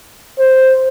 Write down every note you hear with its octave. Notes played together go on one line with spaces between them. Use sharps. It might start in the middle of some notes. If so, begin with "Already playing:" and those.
C5